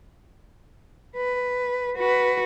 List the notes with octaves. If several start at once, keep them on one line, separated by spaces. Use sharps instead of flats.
B4
F#4 B4